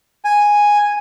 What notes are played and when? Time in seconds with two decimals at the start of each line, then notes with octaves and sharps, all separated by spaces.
0.25 G#5